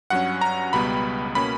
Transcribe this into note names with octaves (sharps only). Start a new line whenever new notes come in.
G2 F#3 C#4 F#5
A#5
C#2 B2 G3 B3 B5
B2 A#3 C#4 B5